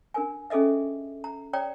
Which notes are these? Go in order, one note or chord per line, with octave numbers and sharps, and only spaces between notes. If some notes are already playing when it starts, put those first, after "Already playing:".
D4 A#4 G#5
C#4 G#4 A4 D#5 E5
A#5
C#5 D5 G5 A#5